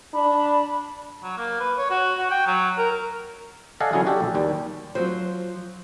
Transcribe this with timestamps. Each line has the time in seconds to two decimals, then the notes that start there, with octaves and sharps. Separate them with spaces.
0.14 D4 B5
1.23 F#3
1.38 A#3
1.60 B4
1.78 C#5
1.91 F#4
2.18 F#4
2.31 G5
2.46 F#3
2.78 A#4
3.80 A4 D5 D#5 F5 F#5 G#5
3.93 D3 F#3 C#4 E4 G#4
4.06 D4 F#4 G4 A4
4.20 A#1
4.34 D#2 G3
4.95 F3 F#3 C5